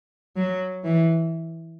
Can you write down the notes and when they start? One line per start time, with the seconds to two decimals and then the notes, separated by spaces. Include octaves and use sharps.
0.36 F#3
0.84 E3